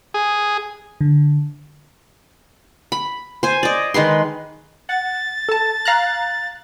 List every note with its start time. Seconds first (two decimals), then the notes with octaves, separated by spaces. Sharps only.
0.14 G#4
1.01 D3
2.92 B5
3.43 C5 G#5
3.63 D5 D#5
3.94 D#3 G#3 B4 C6
4.89 F#5 A6
5.49 A4 A5
5.85 F5 A#5 F#6